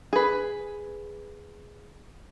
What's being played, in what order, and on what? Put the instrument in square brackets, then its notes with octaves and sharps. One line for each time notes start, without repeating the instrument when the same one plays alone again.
[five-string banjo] G#4 B4